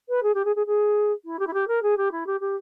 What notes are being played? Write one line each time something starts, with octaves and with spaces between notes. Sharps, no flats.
B4
G#4
G4
G#4
G#4
G#4
E4
G4
E4
G4
A#4
G#4
G4
E4
G4
G4